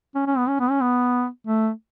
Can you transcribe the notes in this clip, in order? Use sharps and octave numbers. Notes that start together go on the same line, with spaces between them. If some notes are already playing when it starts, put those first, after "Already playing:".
C#4
C#4
B3
C#4
B3
C#4
B3
A3